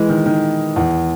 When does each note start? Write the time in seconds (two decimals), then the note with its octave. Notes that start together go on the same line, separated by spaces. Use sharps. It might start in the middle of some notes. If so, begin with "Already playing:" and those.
Already playing: E3 G#3
0.09 D#3
0.26 D#3
0.76 E2